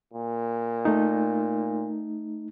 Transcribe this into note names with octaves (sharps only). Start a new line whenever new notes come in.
A#2
A3 D#4